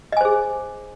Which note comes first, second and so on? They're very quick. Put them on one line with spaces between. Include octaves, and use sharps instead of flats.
D#5 G#5 C5 G#4